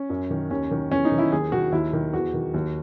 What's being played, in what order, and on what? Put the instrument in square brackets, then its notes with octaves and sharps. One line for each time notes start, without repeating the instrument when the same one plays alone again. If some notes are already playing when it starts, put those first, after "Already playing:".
Already playing: [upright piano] C#4
F#2
D#3
D#2 C#4
D#3
E2 C#4
D#4
D#3
E4
D#2 G#4
D#3 F#4
D#2 E4
D#3
E2 F#4
D#3
D#2